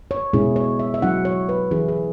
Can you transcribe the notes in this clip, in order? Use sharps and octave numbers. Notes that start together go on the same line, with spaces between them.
C#5
B2 G#3 C#4 E4 G#4
C#5
E5
E5
F#3 C#4 E4 F#5
C#5
B4
E3 C#4 E4 G#4
G#4